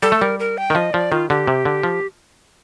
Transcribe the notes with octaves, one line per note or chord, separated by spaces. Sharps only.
G3 A4
A3
G3 A#4
A#4
G5
D#3
F3 D#5
F3 D5
D#3 F4
D3 G4
C3
D3
F3